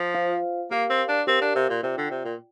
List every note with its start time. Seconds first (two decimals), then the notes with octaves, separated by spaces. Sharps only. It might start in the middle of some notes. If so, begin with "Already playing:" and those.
Already playing: F3
0.15 F4 C5 F5
0.71 A#3 G4 A#4 F5
0.89 C4
1.09 D4
1.27 C4 G4 A#4 F5
1.41 D4
1.56 C3
1.69 A#2
1.83 C3 F4 D5 G5
1.98 D3
2.11 C3
2.25 A#2